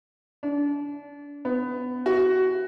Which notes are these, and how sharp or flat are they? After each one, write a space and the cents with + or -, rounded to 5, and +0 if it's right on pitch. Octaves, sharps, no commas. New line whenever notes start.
D4 -30
B3 +20
F#4 +15